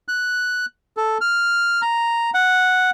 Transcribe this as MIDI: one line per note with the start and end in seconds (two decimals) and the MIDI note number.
0.08 0.66 90
0.97 1.18 69
1.21 1.81 89
1.82 2.30 82
2.34 2.91 78